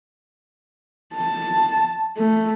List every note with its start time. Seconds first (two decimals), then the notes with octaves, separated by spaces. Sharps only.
1.15 A5
2.17 A3